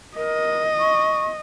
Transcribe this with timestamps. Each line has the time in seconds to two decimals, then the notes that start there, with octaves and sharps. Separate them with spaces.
0.16 A#4 D#5
0.80 C#6